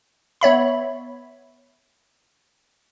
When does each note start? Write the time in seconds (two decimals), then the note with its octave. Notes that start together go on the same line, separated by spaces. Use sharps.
0.41 B3 C#5 E5 B5